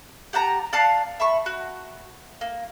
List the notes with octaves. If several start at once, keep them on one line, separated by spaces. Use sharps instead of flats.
G4 F#5 A5 A#5
D5 F5 F#5 A5
E5 B5 C#6
F#4
A#3